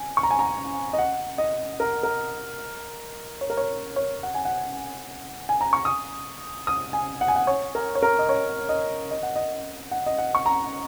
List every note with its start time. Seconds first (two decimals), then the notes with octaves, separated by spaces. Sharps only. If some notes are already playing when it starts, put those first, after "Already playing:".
Already playing: G#5
0.17 C#6
0.23 A#5
0.31 G#5
0.39 A#5
0.93 D#5
0.98 F#5
1.38 D#5
1.80 A#4
2.03 A#4
3.41 C#5
3.50 A#4
3.57 C#5
3.96 C#5
4.23 F#5
4.34 G#5
4.45 F#5
5.49 G#5
5.61 A#5
5.73 C#6
5.85 D#6
6.67 D#6
6.93 G#5
7.21 F#5
7.28 G#5
7.36 F#5
7.47 C#5
7.75 A#4
7.95 C#5
8.03 A#4
8.19 D#5
8.29 C#5
8.69 D#5
9.11 D#5
9.23 F#5
9.36 D#5
9.91 F#5
10.06 D#5
10.18 F#5
10.35 C#6
10.46 A#5